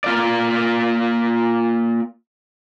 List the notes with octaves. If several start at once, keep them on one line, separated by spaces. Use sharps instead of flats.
A#3 F4 D5